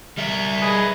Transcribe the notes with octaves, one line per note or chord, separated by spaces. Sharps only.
G3 E5
G#4 B4 D#5